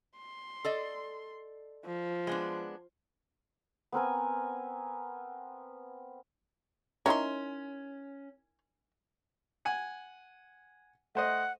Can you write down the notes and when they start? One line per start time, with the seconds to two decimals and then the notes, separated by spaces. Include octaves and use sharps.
0.17 C6
0.65 A4 D5 D#5
1.85 F3
2.27 G#3 B3 D4
3.92 B3 C4 A#4 G#5
7.06 C#4 D#4 E4 A#4 C#5 C6
9.65 F#5 G#5
11.15 A3 C5 D#5 F#5